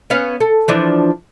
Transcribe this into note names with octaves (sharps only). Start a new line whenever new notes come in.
B3 C#4 F5
A4
E3 F3 D4